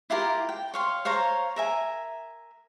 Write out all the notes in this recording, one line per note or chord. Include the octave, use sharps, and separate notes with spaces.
E4 F4 G4 A#4
G5
C#5 F5 C6
C5 C#5 F5 A#5
A#4 E5 G#5